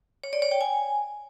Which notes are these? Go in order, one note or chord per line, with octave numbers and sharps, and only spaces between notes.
C#5
D5
C#5
G5
G#5